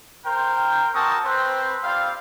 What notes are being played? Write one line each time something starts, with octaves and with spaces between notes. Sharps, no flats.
A#4 C5 G5
C4 F#4 A#4 A5 C#6 D#6
C4 B4 C5
G3 C4 F4 F5